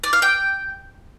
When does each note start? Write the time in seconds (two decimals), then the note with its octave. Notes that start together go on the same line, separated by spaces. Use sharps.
0.04 D5
0.13 F5
0.22 G5